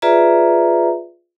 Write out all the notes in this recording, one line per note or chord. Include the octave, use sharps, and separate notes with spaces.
F4 G#4 B4 D5 E5 A#5